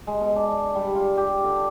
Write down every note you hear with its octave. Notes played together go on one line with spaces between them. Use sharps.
G#3
B2
D4
G3
F4
G4
D3